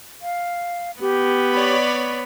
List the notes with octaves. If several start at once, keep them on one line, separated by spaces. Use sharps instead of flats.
F5
B3 G4
C#5 D5 B5